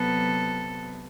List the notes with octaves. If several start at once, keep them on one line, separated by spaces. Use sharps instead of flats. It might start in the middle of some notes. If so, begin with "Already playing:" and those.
Already playing: C3 F#3 B3 A4